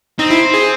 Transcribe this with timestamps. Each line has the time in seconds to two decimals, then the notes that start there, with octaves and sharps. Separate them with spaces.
0.19 C4 D#4
0.30 E4
0.54 G#4